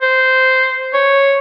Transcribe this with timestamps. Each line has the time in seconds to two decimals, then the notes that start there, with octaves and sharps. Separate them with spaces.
0.02 C5
0.93 C#5